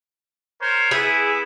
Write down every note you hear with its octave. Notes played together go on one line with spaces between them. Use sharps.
A#4 C5 C#5
B3 E4 G#4